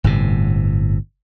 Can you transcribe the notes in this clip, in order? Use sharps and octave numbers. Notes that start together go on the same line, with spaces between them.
G1 A2 C3